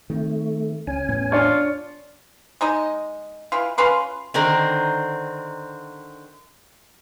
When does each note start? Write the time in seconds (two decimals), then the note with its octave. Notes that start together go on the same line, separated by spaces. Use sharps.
0.10 D#3 A3 C4
0.87 C#2 C#4 G#5
1.09 E2 A2 B3
1.32 D4 F4 C#5
2.61 G#3 D#4 D#5
3.52 E3 F4
3.78 C#4 F4 B4 C6
4.34 D3 D#3 C4 D4 A#4